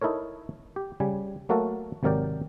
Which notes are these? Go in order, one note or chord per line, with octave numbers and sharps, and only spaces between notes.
D#4 E4 A4 A#4 C#5
G4
C#3 G3 G#5
F#3 A3 A#3 F#4 A4 A#4
G#1 C3 F#3 A#4 D5 G5